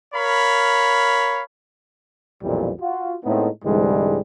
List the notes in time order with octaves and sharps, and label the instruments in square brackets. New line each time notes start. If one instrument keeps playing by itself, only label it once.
[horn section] A#4 C#5 F5 B5
[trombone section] B1 F2 A#2 E3 G3
F4 F#4
A2 G#3 A3 B3 C4 D#4
C2 G#2 D3 E3 G3 G#3